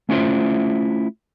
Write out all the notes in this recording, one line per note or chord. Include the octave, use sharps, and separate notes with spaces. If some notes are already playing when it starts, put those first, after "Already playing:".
A3 C#4 E4 F4 C5 E5